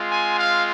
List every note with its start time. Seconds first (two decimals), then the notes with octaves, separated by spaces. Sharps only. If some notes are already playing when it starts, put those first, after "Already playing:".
Already playing: G#3 C4 F4
0.09 G#5
0.37 F5